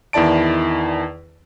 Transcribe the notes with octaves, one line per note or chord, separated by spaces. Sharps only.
E2 D#3 E4 D5 A5 D7